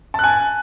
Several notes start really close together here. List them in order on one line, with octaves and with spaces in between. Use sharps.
A5 F#6 G#5